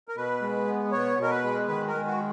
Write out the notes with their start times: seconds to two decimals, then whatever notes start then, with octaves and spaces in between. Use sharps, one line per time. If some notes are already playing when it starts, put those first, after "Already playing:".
0.08 A#4
0.16 B2 B4
0.42 G#3
0.68 B3
0.92 B2 C#5
1.18 B2 A#4
1.30 B4
1.44 G#3
1.68 D#3 B4
1.88 A#4
1.94 G#3
2.07 F#4